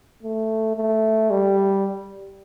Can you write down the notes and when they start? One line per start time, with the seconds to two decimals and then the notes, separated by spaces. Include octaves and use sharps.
0.23 A3
0.76 A3
1.31 G3